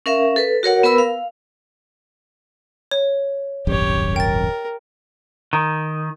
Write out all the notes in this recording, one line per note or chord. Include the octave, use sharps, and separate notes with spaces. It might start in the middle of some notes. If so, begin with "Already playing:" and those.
C#4 A#4 E5 F5
A4 B4
F#4 A#4 C#5 F#5
B3 A#4 B4 B5 E6
F5
C#5
D#1 G#1 F#2 G4 C#5
A#4 G5 A6
D#3